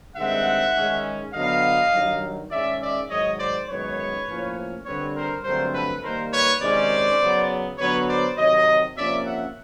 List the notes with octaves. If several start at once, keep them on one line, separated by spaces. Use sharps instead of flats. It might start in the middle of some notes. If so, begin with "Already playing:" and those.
G2 D#3 G#3 C4 E5 F#5
D#3 G#3 C#4
D3 F#3 B3 D#5 F5
G2 D#3 F#3
D#3 G#3 C#4 D5 E5
D5 E5
G#2 D#3 F#3 C#5 D#5
C5 D5
F#2 D#3 G#3 B3 B4 C#5
A2 F3 A#3 C#4
G2 D3 G3 C4 B4 C#5
A#4 C5
G2 D3 F#3 A3 C4 A#4 C5
A4 B4
D#3 G3 A#3 A#4 C5
B4 C#5
C3 D#3 G#3 C#4 C5 D5
C#3 F#3 B3
D3 F#3 B3 B4 C#5
C5 D5
C3 D#3 F#3 C#5 D#5
C3 F3 A#3 C#4 D5 E5
E5 F#5